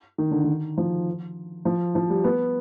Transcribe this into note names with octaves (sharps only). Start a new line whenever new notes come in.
D#3
D3
D#3
F3
F3
F3
G3
B3